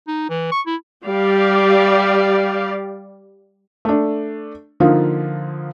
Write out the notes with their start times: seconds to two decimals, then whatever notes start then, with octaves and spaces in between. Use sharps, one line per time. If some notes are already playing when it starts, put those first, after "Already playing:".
0.07 D#4
0.29 E3
0.52 C#6
0.66 E4
1.06 G3 G4 D5 F5
3.85 A3 D4
4.80 D3 F3 A#3 D#4 F4